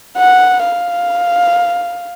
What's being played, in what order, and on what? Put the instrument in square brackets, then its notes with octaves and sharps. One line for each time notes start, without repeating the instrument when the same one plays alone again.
[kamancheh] F#5
F5